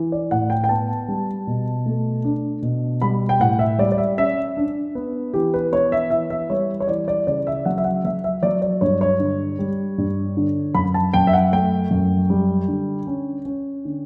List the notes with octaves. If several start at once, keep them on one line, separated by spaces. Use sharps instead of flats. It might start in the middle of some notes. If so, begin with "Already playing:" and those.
Already playing: E3
D5
A2 F#5
G5
G5
B3 A5
G3
B2
A3
D4
B2
G3 B5
G5
A2 F#5
E5
G3 D5
D5
E5
C#4 E5
D4
B3
E3 G4
B4
B3 C#5
E5
E3 E5
E5
G3 C#5
C#5
E3 D5
D5
C#3 D5
E5
F#3 F#5
E5
F#5
F#3 E5
E5
F#3 D5
D5
G2 C#5
C#5
D3
G3
G2
D3
F#2 B5
A5
F#2 G5
E5
F#5
A3 G5
F#2
G3
D3
C#4
C#4
D3